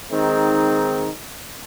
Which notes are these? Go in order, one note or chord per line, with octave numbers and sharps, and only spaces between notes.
D#3 G#3 C4 D#4